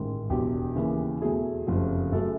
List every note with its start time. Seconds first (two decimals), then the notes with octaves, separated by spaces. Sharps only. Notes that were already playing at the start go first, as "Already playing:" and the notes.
Already playing: A1 G#2 D#3
0.30 E1 E2 B2 F#3 G4
0.76 D#2 C#3 E3
1.22 E2 B2 F#3 A3 G#4
1.67 F#1 F2 C3 F3 A3
2.12 F#2 C#3 F#3 A3 A4